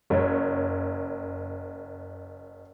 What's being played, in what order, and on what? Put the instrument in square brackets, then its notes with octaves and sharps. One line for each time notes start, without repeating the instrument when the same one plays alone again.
[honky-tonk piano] F#1 C#5